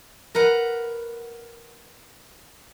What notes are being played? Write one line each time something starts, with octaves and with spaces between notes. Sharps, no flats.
A#4 B4 F#5